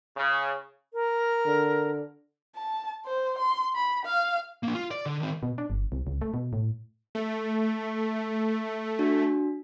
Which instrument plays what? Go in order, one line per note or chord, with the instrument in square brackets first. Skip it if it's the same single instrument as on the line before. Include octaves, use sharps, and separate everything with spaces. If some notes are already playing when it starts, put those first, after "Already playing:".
[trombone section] C#3
[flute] A#4
[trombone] D3
[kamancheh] A5
C5
C6
B5
F5
[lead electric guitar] A#3 D4
F4
D5
D3
D#3 C4
[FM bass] B2
D4
G1
C2
C#2
A3
B2
A2
[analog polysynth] A3
[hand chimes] D4 F#4